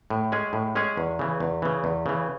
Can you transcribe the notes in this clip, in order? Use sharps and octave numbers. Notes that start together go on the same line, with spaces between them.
A2
G#3 C#4 G#4
A2
G#3 C#4 G#4
E2
C#3 E3
E2
C#3 E3
E2
C#3 E3